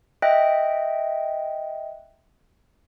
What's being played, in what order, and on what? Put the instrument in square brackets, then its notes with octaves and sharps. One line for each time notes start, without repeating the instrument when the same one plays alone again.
[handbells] D#5 E5 G5 F#6 A#6